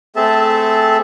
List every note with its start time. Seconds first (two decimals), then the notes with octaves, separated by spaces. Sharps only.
0.16 A3 C4 G#4 A4 E5 A5